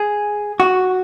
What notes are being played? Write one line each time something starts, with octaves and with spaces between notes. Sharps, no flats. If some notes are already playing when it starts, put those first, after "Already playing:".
Already playing: G#4
F#4